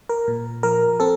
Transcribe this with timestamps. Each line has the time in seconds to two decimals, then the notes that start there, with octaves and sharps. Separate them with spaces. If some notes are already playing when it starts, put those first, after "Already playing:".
0.09 A#4
0.28 A#2
0.63 F3 A#4
1.00 C4 A4